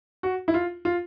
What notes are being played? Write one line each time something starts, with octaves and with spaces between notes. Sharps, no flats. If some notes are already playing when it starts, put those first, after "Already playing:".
F#4
E4
F4
F4